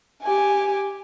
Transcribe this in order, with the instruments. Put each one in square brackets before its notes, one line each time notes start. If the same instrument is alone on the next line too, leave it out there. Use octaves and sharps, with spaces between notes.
[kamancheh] G4 G#5